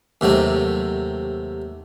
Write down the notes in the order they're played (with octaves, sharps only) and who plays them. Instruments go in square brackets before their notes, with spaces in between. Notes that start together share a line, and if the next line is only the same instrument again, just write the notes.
[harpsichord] D#2 C3 F#3 A3